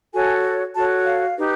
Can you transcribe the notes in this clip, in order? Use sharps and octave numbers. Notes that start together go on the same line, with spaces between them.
F#4 A4 C#5 G#5
F#4 A4 C#5 A5
F5
D#4 G4 B4